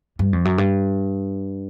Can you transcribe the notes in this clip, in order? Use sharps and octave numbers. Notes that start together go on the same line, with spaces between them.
G2
F2
F#2
G2